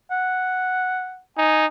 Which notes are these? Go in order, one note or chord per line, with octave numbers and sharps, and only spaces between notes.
F#5
D#4 G#5